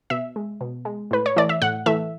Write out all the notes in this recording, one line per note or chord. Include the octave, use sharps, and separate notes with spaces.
B2 E5
G#3
B2
G#3
A2 B4
C#5
E3 A3 D5
E5
A2 F#5
E3 A3 E5